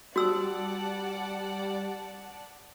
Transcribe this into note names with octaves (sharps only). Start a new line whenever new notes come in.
G3 F#4 D5 F#5 A5 E6